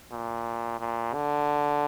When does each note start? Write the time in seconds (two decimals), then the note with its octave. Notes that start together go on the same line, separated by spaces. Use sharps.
0.12 A#2
0.80 A#2
1.14 D3